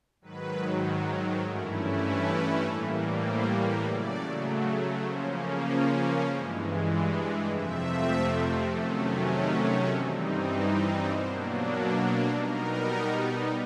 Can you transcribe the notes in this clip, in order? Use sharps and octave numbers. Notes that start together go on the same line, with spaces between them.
G#2 D#3 F#3 B4
G2 E3 A3 C#4 E4 A#4
B4
A2 E3 G3 A#3
C5
C#3 F#3 A3 D5
C#3 F3 A#3 C#4 C5
A#4
B4
G2 E3 G#3 C5
C#5
D5
D5
F2 C3 F3 A3 C4 E5
C3 D#3 F#3 A3 C#4
G2 E3 G3 C4 D#4 E5
B2 F#3 A#3 D4 C5
B4
A#4
B2 G3 B3 D#4 A#4